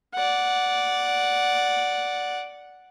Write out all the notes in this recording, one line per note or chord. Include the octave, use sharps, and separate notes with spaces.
D5 F#5